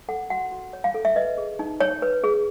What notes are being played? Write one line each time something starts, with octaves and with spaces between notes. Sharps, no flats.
A4 F#5
F#4 F#5
F#4
C#5
F5
A4
E5
B4 D#5
G#4
D#4
D#4 C#5
B4
G#4